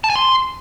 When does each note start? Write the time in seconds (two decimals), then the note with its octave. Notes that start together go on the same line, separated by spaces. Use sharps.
0.04 A5
0.10 G#5
0.16 C6